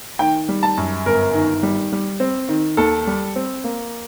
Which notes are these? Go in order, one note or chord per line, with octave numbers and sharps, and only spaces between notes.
D#3 G5
G3
A5
F#2
G1 A#4
D#3
G3
G3
C4
D#3
D#2 A4
G3
C4
A#3